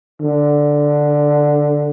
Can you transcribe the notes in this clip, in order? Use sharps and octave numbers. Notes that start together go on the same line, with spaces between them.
D3